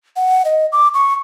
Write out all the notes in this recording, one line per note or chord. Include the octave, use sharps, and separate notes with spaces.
F#5
D#5
D6
C#6